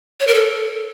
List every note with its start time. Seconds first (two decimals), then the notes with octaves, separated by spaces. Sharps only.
0.20 C#5
0.27 A#4
0.34 A4